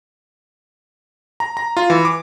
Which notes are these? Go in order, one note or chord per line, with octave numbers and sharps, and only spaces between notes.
A#5
A#5
F4
E3
D6